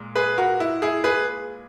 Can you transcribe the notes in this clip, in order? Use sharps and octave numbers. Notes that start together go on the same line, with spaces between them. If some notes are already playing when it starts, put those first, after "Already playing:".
Already playing: A#2 G#3
G#4 B4
F#4 A#4
E4
E4 G#4
G#4 B4